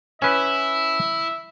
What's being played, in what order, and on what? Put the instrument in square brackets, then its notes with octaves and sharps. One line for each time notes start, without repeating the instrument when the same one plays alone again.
[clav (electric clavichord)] C#4 B4 [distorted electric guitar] E4 [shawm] E5